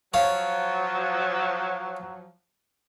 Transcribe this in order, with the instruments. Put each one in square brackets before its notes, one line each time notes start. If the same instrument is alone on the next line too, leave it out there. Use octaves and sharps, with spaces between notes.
[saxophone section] F3 F#3 [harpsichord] C#5 F5 A5